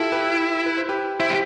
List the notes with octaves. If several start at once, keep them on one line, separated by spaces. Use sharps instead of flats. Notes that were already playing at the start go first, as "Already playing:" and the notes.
Already playing: E4 F4 G4 A4
G4 B4
B4
C5
G4 B4
E4 C5 E5
G4